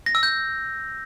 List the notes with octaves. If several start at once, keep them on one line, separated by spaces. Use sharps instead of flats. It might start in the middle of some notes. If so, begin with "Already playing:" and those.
A#6
E6
G6